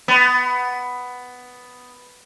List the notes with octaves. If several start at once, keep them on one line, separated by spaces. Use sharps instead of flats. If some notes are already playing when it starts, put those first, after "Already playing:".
B3